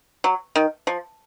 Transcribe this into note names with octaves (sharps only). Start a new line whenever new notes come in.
F#3
D#3
F3